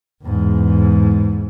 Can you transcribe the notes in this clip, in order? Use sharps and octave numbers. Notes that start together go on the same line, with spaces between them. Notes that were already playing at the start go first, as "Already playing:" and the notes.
E2 G#2